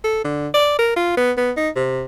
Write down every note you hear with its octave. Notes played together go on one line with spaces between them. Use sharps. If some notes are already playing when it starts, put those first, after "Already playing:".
A4
D3
D5
A#4
F4
B3
B3
D#4
C3